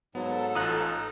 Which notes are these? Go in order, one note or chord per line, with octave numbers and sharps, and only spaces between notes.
G#2 F#3 B3 A4
A1 D#4 F4 A#5 D#6 F#6